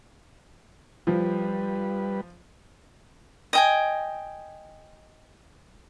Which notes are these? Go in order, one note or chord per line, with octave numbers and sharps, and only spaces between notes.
F3 G3 B4
D#5 G5 G#5